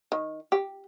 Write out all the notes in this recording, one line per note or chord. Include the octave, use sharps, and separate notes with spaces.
D#3
G4